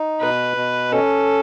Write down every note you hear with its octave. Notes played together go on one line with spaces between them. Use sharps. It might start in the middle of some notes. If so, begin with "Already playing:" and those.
Already playing: D#4
B2 B4
B2
C#4 A4